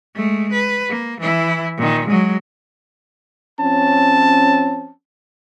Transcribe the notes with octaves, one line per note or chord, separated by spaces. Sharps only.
G#3 A3
B4
A#3
E3 E4
A#2 D#3
F#3 G#3
F3 C4 C#4 A5